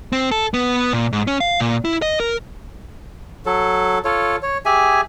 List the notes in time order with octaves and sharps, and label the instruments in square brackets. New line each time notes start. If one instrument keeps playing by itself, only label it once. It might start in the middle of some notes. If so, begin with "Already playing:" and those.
[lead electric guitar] C4
A4
B3
A#2
G#2
C#4
F5
A#2
E4
D#5
A#4
[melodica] F#3 A4
F4 A4 C#5
C#5
G4 G#4 E5 G#5